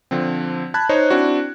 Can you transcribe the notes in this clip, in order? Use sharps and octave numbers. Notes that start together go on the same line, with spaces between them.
D3 F3 C4
A5 B5 F#6 G#6
D#4 C5 C#5 D#5
C4 D4 E4 F#4